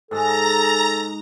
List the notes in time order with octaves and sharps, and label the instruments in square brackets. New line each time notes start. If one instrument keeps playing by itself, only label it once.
[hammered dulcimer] G#2 G#3 [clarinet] A4 [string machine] A#5 A#6